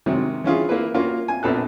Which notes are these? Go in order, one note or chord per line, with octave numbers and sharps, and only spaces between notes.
G#2 C3 D#3 F#3
E3 C#4 F4 G#4
A#3 E4 B4
A#3 C#4 F4 F#4
G#5
A#1 A#2 B3 A4 F#6